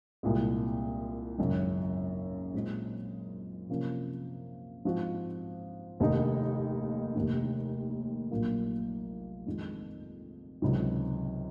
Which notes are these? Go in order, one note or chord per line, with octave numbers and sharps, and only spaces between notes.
C2 A#2 G#3
G#1 F#2 C#3
A#2 G#3 C4 D#4
C3 F3 A#3 C#4
G#2 F3 C4 F#4
F1 D#2 D#3 A#3 D#4
F1 D#2 D#3
A#1 A#2 F#3 A#3 F4
F2 D#3 G#3
C#2 C3 D#3 F#3